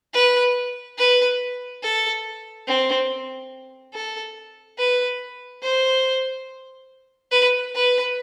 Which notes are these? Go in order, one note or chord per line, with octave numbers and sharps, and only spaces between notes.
B4
B4
A4
C4
A4
B4
C5
B4
B4